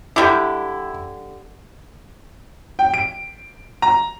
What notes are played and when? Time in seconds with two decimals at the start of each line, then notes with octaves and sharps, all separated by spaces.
0.16 D3 G3 E4 G4
2.79 G5
2.94 D7
3.82 A#5